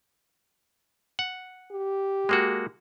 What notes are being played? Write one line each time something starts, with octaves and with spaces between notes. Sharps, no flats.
F#5
G4
G#3 A#3 F#4